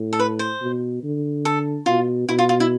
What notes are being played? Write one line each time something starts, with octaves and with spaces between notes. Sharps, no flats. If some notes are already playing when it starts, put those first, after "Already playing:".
Already playing: A2
A4
B4
C5
B2
D3
A4
B2 F4
B2 E4
F4
F4
E4